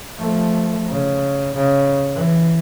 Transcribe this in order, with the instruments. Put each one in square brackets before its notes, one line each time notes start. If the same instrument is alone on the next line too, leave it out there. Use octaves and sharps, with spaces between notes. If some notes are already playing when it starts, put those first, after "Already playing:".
[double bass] F3 A3
C#3
C#3
E3